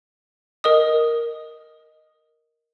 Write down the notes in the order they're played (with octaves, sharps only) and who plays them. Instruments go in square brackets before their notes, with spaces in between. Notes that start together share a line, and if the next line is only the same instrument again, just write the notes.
[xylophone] A#4 D#5 D#6